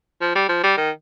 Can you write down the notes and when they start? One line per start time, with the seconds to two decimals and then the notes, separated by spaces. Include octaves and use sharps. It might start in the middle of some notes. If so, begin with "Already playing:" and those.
0.21 F3
0.35 G3
0.49 F3
0.63 G3
0.77 D#3